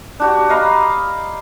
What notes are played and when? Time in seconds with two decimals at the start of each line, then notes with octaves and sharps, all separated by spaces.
0.20 D4 F#4 G4
0.49 D#5 F5 A#5 B5